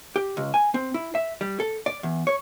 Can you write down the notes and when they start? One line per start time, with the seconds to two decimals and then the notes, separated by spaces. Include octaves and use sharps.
0.16 G4
0.37 C#2
0.54 G#5
0.74 C4
0.94 E4
1.15 E5
1.41 G3
1.60 A4
1.86 D5
2.03 E2
2.27 C#5